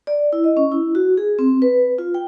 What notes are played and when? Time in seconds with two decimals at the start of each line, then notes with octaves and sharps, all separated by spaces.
0.07 D5
0.33 E4
0.44 D#5
0.57 C#4
0.72 E4
0.95 F#4
1.17 G#4
1.39 C4
1.62 B4
1.98 F4
2.14 G5